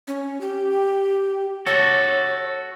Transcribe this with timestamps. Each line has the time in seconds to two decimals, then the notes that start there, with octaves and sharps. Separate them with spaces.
0.07 C#4
0.41 G4
1.66 F#4 A4 C#5